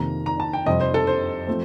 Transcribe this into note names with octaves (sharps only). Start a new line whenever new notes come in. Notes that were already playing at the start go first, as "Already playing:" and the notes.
Already playing: F2 C3 D#3 A#3 A#5
A#5
A5
G5
F2 C3 G3 C4 D#5
C5
A4
C5
F3 A3 C4